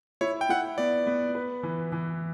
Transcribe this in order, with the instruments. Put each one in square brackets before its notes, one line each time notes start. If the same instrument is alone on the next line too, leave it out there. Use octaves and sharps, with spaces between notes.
[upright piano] E4 [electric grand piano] C#5
[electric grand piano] G5
[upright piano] E4 [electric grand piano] F#5
[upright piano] B3 [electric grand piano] D5
[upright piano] B3
B4
E3
E3